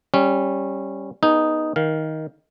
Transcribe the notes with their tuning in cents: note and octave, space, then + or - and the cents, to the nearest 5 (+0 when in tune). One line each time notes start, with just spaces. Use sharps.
G3 +0 C#4 -15
B3 -15 D#4 +0 G#4 +15
D#3 +15 F5 +5